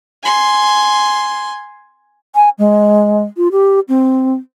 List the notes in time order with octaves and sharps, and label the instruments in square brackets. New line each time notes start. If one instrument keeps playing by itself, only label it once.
[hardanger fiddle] G#5 C6
[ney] G#5
G#3
F4
G4
C4